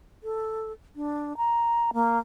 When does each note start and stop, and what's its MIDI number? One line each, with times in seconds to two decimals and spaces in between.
0.23 0.72 69
0.96 1.36 62
1.37 1.91 82
1.93 2.19 58